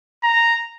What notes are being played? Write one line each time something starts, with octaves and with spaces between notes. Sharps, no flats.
A#5